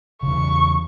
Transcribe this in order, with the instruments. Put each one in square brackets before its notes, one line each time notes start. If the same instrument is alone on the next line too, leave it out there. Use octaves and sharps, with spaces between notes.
[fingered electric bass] E2 C#3 [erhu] C#6